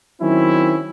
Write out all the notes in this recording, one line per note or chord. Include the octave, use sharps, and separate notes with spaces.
D#3 F#3 C4 C#4 E4